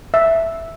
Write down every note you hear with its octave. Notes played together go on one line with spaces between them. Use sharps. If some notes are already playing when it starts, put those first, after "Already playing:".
E5